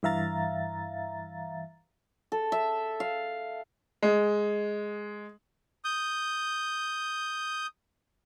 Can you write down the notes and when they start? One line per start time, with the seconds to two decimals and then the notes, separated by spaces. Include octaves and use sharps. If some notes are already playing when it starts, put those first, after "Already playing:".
0.03 G2 E3 E5 F5 A#5 A6
2.32 A4
2.52 E5
3.00 F5
4.03 G#3
5.84 D#6 G6